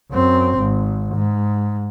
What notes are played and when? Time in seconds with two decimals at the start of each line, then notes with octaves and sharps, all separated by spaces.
0.11 F#2 C4
0.58 G#1
1.14 G#2